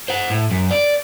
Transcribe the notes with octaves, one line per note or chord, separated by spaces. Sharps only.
C5 F#5
A2
F#2
D5